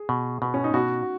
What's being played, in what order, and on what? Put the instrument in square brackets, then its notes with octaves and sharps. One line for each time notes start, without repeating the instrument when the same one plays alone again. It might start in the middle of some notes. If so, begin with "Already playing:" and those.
Already playing: [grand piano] G#4
[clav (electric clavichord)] B2
[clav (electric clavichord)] B2 [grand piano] B3
[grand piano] C#4
D#4
[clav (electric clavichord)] B2 [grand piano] F#4